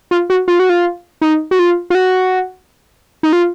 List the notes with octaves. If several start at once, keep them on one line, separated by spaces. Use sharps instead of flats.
F4
F#4
F4
F#4
F4
D#4
F#4
F4
F4
F#4
D#4
F4